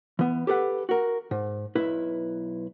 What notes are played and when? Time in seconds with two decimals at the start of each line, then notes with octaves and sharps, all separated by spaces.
0.19 E3 B3
0.47 G4 A4 B4 F#5
0.89 F#4 A#4
1.31 G#2
1.75 B1 E4 B4